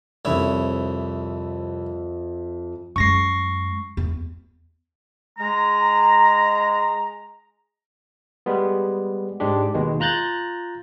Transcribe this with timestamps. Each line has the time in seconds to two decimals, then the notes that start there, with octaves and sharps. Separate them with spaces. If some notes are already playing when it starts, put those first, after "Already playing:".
0.25 C2 F2 E4 C#5 E5
2.96 F#2 G#3 C#6 A#6 C7
3.97 E2
5.39 G#3 A#5
8.46 G3 G#3 B3
9.40 G#2 G#3 D4 G4
9.74 D#2 B2 D#3 G#3
10.00 F4 A#5 F#6 G6 A6